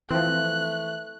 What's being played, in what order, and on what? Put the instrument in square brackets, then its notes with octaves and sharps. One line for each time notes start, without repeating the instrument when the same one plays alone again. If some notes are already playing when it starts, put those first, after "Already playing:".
[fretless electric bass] E3 [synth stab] F3 C4 [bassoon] A3 [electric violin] F#6